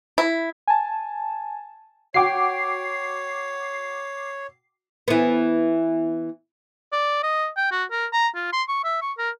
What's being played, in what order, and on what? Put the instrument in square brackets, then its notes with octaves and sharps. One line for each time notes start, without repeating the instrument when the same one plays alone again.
[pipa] E4
[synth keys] G#5 A5
[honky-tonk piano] F#4 F#5 G5 [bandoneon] C#5 [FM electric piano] D6 C7
[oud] E3 B3
[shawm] D5
D#5
G5
F#4
A#4
A#5
F4
C6
C#6
E5
C#6
A#4